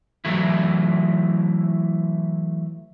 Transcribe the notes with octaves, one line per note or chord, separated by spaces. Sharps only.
E3 F#3 A3 E4